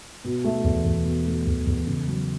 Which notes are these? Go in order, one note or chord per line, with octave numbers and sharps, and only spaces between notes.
B2
A3
E2
E2
B2
A3
E2
E2
C#3
F#3